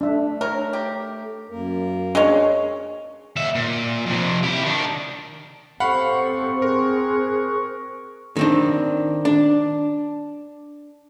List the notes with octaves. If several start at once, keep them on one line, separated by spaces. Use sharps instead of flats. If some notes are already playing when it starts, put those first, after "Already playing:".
A3 D4 E5
A#4 C#5 A#5
G4
F#2 A#3 A#4
G#3 C#4 D4
D#2 E5
A#2
F2 C3
E4 G4
D#3 D4
C4 G4 A4 C5 F5 F#5 B5 C#6
G#4 A#4 C5 F#6
D#3 C4 D4
D4